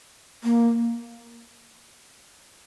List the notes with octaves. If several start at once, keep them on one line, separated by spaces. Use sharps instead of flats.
A#3